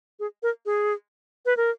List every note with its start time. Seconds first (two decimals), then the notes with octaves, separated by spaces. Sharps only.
0.20 G#4
0.43 A#4
0.66 G#4
1.46 B4
1.57 A#4